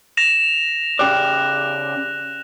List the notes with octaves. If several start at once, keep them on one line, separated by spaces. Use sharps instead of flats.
A#6 E7 F7
C#3 G4 D5 F#6